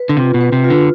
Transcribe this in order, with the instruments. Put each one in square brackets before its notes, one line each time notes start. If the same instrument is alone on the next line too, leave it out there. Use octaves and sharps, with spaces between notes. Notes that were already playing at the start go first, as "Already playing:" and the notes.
Already playing: [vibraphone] B4
[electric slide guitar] D3
[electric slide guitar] C3 [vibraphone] F4
[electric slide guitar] B2
[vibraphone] B4
[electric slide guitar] C3
[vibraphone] F4
[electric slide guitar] D3